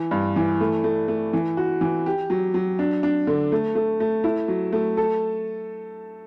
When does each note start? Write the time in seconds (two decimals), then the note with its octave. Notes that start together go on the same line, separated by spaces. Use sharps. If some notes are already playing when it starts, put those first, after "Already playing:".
Already playing: E3
0.11 G2
0.36 E3
0.60 A3
0.84 A3
1.08 A3
1.33 E3
1.57 F#4
1.81 E3
2.06 G4
2.30 F#3
2.54 F#3
2.79 D4
3.03 D4
3.27 D3
3.52 A3
3.75 A3
4.00 A3
4.24 E4
4.48 F#3
4.72 A3
4.97 A4